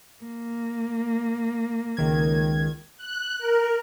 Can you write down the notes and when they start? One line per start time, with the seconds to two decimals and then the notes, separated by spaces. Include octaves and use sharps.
0.23 A#3
1.97 C#2 D#3 G#6
2.97 F#6
3.39 A#4